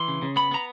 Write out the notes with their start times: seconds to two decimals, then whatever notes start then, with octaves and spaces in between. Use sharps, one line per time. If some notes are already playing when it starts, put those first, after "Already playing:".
Already playing: E3 C6
0.08 C#3
0.22 C#3
0.36 B3 B5
0.51 B3 A#5